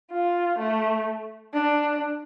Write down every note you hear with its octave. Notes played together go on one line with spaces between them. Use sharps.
F4
A3
D4